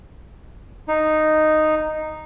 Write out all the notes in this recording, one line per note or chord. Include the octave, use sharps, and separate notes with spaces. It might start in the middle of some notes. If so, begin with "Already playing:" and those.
D#4